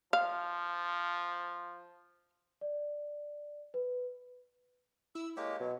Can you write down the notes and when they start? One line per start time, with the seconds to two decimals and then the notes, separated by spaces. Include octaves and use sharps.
0.13 F3 F5
2.61 D5
3.74 B4
5.15 E4 E6
5.37 G#3 A#3 G4 C#5
5.60 B2 F#3